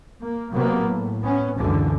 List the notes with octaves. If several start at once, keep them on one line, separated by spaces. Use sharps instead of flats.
A#3
C3 F#3 A#3 B3
A2
B3 C#4
C#2 F#2 B2 D3 E3